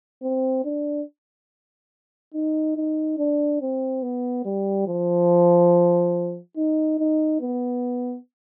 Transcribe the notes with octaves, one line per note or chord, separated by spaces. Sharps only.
C4
D4
D#4
D#4
D4
C4
B3
G3
F3
D#4
D#4
B3